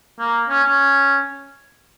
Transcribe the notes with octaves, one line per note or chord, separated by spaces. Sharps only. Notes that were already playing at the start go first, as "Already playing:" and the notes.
A#3
C#4
C#4